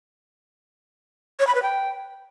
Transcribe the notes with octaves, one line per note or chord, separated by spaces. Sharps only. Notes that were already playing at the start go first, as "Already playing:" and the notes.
C#5
B5
B4
G5